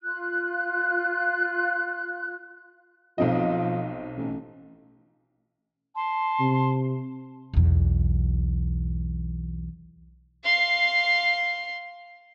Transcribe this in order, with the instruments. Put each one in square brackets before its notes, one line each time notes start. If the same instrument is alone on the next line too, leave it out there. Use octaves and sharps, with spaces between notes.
[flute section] F4 F#6
[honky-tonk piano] B1 C4 D#5 [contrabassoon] F3
[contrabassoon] A1
[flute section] A5 C6
[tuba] C3
[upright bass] B1 E2
[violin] F5 C6